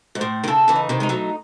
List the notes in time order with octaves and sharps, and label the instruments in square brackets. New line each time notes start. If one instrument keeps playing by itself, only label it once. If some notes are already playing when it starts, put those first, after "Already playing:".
[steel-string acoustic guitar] G#2
[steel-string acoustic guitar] A2 [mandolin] C5
[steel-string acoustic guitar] D#3
[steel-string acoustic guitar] C#3 [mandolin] A4
[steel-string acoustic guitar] C#3 E3
[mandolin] D#4
[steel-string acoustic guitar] C3 D#3
[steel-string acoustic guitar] G#3 [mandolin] D#4
[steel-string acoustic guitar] F#3 A3